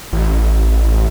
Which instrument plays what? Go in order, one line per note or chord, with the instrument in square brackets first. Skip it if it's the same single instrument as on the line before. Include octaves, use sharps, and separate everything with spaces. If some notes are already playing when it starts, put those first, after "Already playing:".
[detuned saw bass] A1